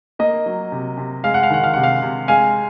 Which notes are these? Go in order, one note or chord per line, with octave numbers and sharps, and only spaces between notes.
A#3 D#5
F#3
C3
C3
G#3 F5
F#5
F5
D#3 F#5
F5
C3 F#5
F5
C3
G#3 F5 G#5